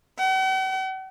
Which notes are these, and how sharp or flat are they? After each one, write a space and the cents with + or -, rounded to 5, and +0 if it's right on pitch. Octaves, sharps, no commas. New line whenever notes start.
F#5 +45